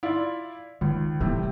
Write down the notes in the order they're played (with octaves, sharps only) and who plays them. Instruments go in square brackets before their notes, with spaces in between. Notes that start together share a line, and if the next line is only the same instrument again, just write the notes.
[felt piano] E4 F4 D5
[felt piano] C#2 [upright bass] D#3
[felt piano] A2 C3 [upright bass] E3 G3